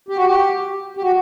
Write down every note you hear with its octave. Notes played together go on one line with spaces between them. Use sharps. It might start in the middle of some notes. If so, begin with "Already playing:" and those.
G4
F#4
G4
G4
F#4